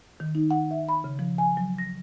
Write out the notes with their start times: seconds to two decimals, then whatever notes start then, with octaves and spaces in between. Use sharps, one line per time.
0.20 D#3
0.35 D#4
0.51 F#5
0.71 E5
0.89 B5
1.04 C#3
1.19 F3
1.38 G#5
1.57 F#3
1.78 A#6